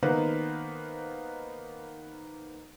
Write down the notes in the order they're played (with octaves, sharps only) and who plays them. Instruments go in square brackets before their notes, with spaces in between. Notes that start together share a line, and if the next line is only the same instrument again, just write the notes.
[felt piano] D#3 A#3 B3 D#4 B4 C5